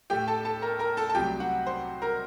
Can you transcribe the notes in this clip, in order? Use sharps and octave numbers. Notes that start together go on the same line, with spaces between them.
A2 A3 G4 G5
A4 A5
A4 A5
A#4 A#5
A#4 A#5
A4 A5
A5
C2 C3 F#3 A3 G4 G5
F#4 F#5
C5
A#4 A#5